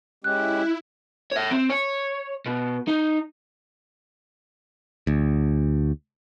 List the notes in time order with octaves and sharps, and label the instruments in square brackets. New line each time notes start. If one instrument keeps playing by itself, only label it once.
[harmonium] G#3 C#4 G4 [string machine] E4 [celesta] F#6
[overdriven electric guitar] C#5 E5
C4
C#5
B2
D#4
[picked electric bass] D2